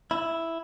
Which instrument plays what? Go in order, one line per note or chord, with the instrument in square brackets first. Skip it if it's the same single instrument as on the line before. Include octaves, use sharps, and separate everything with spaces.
[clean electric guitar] E4